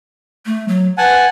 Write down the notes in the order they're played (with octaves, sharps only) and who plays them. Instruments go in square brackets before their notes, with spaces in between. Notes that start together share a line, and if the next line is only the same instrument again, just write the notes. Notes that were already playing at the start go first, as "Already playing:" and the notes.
[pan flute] A3
F#3
[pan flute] B4 [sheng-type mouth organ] F#5 G#5 A5